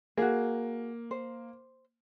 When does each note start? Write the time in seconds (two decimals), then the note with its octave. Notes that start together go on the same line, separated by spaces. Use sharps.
0.17 A#3 F#4 G#4
1.11 C5